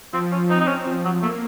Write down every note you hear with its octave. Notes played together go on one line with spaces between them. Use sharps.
F3 C4
C#4
C4 D#4
D#4
C#4
F3
F#3
A3 A#3